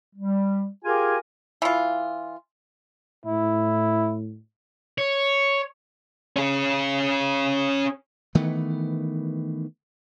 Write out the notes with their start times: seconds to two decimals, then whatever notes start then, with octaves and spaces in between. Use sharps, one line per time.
0.16 G3
0.85 F4 G4 G#4 A#4 G#5
1.62 E3 F4
3.26 A2 E4
4.98 C#5
6.36 C#4 G#4
8.35 D#3 E3 A3 B3